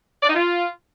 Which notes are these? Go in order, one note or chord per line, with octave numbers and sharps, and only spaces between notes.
D5
D#4
F4